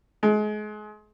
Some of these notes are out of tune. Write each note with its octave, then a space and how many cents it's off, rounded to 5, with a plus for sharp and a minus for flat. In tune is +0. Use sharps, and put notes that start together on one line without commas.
G#3 +30